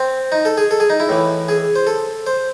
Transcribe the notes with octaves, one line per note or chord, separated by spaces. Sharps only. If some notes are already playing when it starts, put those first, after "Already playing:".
Already playing: C4
D#4
A4
G#4
A4
G#4
D#4
E4
A2 E3
G#4
C5
A4
C5